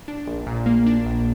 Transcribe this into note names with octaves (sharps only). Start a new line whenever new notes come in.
D4
A#1
A#2
A#3
D4
A#1